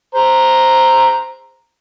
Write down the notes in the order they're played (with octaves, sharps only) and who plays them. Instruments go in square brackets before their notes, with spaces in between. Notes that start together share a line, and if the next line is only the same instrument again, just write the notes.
[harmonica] C5 A#5